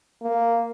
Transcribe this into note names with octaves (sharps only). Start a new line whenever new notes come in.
A#3